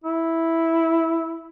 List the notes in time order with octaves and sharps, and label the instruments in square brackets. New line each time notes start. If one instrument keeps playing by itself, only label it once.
[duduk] E4